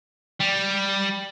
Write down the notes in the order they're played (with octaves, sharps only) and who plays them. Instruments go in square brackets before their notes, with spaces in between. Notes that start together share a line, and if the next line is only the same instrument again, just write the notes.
[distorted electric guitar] G3